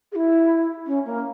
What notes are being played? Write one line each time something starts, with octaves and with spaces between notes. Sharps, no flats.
G#4
E4
C#4
A#3